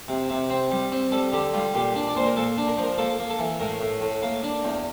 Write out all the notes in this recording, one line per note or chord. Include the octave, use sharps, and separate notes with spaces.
C3
C3
C4
G3
C4
G3 A4
D3 G4
G3 F4
A#2 G4
D4
D5
A#2 C5
A#4
A#2 A4
D4
A#4
F3
A#4
A#3 A4
A#3
A4
E3
A2 A#4
A2
A2
A#3
D4
E2